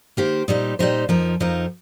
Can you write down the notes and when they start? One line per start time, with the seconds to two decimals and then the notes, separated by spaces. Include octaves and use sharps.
0.17 D#3 A#3 G4 C5
0.48 A#2 G3 D#4 G4 C5
0.79 A#2 G3 D#4 G4 C5
1.09 F2 F3 D#4 A#4
1.40 F2 F3 D#4 A#4